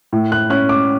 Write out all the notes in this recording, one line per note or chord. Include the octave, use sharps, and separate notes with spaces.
A2
F#6
C#4 F#6
D6